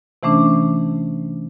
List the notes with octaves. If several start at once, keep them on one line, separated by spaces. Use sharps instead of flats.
C3 E3 A3 C#4 D4